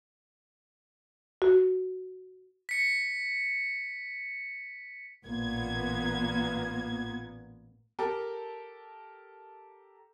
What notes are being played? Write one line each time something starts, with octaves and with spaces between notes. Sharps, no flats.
F#4
B6 C#7
A1 A#2 A#3 B3 G#6
G4 A4 A#4